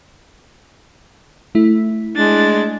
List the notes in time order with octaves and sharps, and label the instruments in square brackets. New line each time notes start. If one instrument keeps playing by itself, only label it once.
[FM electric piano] A3 E4
[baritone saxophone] G#3 [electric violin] D4 A6